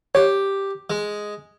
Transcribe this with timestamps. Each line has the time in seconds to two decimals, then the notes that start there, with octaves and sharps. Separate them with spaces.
0.15 G4 C#5
0.90 G#3